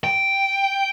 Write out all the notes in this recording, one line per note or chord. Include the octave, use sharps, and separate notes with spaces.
G5